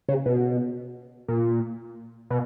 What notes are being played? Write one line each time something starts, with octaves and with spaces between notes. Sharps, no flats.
C#3
B2
A#2
B2